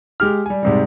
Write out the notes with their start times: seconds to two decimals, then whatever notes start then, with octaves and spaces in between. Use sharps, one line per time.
0.20 G#3 G4 F6
0.46 G3 G#5
0.63 G#2 C3 G3